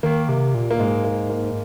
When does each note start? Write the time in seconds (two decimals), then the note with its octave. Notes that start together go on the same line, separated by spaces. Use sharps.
0.03 D#3 A#3
0.29 C3
0.55 A#2
0.71 A#3
0.79 G#2 G#3
1.04 A#3
1.30 A#3